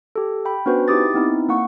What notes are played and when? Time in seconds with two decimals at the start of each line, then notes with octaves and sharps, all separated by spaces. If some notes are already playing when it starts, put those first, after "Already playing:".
0.16 G4 A4
0.45 G5 B5
0.66 B3 C#4 D4 F#4 B4 C5
0.88 D#4 E4 G4 D6 D#6 A6
1.14 B3 C4 D#4 E4
1.48 A#3 F#5 C#6